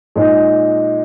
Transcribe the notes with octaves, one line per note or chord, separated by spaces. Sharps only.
A#2 G#3 D#4